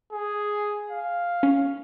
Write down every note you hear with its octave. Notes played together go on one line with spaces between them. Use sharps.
G#4
F5
C#4